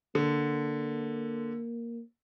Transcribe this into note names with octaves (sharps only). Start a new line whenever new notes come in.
D3 A#3